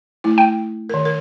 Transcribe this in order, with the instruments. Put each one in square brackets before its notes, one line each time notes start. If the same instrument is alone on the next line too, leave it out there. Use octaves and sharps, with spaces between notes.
[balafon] A3 E4
[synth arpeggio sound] G5
[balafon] D#3 A#4
A#4